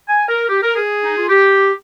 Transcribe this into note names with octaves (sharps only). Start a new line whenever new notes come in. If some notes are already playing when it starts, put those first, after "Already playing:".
G#5
A#4
G4
A#4
G#4
D#4
F4
G4